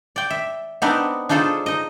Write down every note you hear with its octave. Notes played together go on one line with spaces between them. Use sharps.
D5 G5
E5
B3 C4 D4 D#4 A#4 B4
D4 D#4 F4 G#4 A4 C5
D#4 D#5